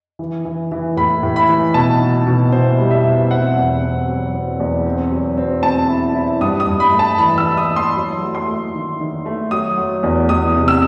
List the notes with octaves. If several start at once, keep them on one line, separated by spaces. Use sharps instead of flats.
E3
E3
E3
A2 B5
A2
B5
E3
B2 A5
D#4
B2
B2 C5
G3
E5
B2
C4 F#5
E2
C4
F#3
C4
E2
C4
F#3
C4
C4 A5
E4
E4
G2 D#6
D#6
G2
B5
A3
A5
E3 B5
E6
E3
D#6
E3
C6
F#3
A3
C6
A3
D#3
D#3
A3
F#3 D#6
F#3
E2
E2 D#6
C3
E6